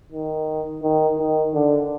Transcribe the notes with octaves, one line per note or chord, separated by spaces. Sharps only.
D#3
D#3
D#3
D3